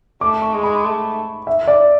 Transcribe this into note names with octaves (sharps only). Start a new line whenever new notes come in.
A3 D6
C#6
G#3
B5
A3
E5
D5